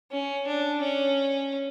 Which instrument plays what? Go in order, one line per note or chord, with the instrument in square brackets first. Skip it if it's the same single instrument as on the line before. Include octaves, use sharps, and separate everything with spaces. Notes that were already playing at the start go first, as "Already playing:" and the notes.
[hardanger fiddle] C#4
D4
C#4